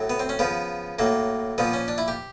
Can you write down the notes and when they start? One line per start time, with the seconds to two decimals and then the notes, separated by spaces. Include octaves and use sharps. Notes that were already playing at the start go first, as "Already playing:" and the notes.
Already playing: A2 F#3
0.10 B3
0.19 C4
0.29 C#4
0.39 C#3 F3 B3
0.99 A2 F#3 A#3
1.58 A#2 F3 B3
1.73 C#4
1.88 D4
1.98 E4
2.08 G4